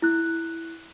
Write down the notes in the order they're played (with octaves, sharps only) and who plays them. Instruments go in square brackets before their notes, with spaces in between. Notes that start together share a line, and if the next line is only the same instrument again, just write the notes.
[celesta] E4 F#6